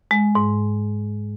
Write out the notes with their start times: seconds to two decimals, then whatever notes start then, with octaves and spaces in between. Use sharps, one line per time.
0.11 G#3
0.35 G#2